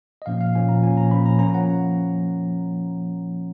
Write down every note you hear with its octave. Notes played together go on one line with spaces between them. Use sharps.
D#5
A#2 F3 A#3 C#4 F5
F5
A#2 F3 A#3 C#4 G#5
A#5
A#2 F3 A#3 C#4 G#5
A#5
A#2 F3 A#3 C#4 B5
A#5
F3 A#3 C#4 A#5
F#5